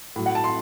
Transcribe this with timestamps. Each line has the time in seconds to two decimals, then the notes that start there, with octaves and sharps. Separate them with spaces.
0.16 A2 F#3
0.26 F#5
0.35 A5
0.44 C6